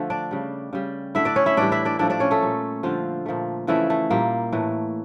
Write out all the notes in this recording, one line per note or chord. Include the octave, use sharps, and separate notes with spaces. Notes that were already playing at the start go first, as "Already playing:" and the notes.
Already playing: D3 F3 A3
D4 D5
C#3 G3
C#3 G3
D3 A3 E4 E5
D4 D5
C#4 C#5
E4 E5
A2 E3 G3 D4 D5
E4 E5
D4 D5
A2 F3 A3 D4 D5
D4 D5
C#4 C#5
A3 A4
A#2 G3
D3 F3 G3 F4
A#2 F3 A3
C#3 E3 F3 A3 E4
A3
A#2 G3 A#3
A2 E3 A3